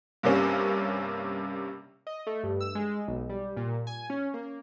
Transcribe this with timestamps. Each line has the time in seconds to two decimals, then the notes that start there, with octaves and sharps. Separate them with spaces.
0.23 G2 C3 A#3 C#4
2.07 D#5
2.27 A3
2.43 G2
2.61 E6
2.75 G#3
3.08 B1
3.30 G3
3.57 A#2
3.87 G#5
4.10 C#4
4.34 A#3